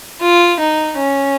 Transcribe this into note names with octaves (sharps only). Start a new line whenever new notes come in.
F4
D#4
C#4